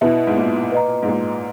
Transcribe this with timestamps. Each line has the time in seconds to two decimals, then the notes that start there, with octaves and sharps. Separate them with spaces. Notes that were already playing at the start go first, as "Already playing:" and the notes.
0.01 B2 E4 B4 E5
0.27 G#2
0.37 A#2
0.72 B4 D#5 A#5
1.03 G#2
1.08 A#2